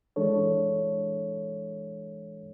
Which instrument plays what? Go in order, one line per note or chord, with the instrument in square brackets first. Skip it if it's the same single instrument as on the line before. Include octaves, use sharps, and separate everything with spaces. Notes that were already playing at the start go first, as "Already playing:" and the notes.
[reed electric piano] E3 G#3 D4 A4 C#5